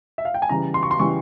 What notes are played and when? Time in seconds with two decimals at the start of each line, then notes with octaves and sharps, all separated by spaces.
0.18 E5
0.25 F5
0.34 G5
0.42 G#5
0.49 C#3 E3 G3 A#5
0.74 C6
0.83 C#6
0.91 C6
0.99 C#3 E3 G3 C#6